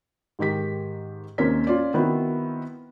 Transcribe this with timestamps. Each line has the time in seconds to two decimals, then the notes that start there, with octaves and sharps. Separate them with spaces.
0.39 G#2 D#3 G4 B6
1.38 D#2 A#3 C4 C#4 B6
1.67 C#4 F4 C#5 D5
1.94 D#3 B3 C4 E4 F#4 B4